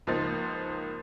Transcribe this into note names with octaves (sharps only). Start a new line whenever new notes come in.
C#2 F3 A#3 D#4 C5 A6